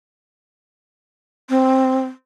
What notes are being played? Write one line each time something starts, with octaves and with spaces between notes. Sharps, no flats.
C4